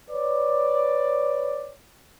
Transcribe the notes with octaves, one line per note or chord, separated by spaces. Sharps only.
B4 C#5 D5